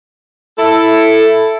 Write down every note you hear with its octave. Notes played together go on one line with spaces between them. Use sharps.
E4 A4